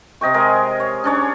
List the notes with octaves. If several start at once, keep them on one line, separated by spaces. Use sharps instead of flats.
C3 D#5 G5 C#6
G#3 G#4 A#4
C#5
C#4 D4 C#5